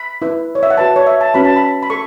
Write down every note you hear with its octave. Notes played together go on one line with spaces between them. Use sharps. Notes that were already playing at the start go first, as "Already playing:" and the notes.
Already playing: B5
E4 B4
C#5
E5
F#5
F#4 B4 A5
C#5
E5
A5
C#4 F#4 B4 B5
A5
B5
B5
A4 C#6